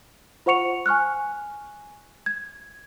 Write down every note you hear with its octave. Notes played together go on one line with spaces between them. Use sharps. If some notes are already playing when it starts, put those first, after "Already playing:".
F4 C5 F#5 C#6 C#7 F7
G#5 C#6 F6 F#6
G#6